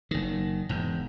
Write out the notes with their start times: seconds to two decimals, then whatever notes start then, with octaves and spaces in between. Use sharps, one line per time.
0.11 F#1 D#3
0.69 E1 G#2